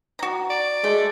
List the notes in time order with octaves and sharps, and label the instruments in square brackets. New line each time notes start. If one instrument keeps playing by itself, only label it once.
[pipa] F#4 A#5
[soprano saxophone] D5
[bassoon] G#3 [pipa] A3